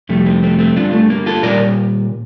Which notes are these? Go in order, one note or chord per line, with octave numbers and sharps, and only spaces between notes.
F2 C3 G3 A3
A3 C4
A3 C4
A3 C4
G2 D3 G3 D4 F4
A3
A#3
F4 A4
A#2 G3 A#4 D5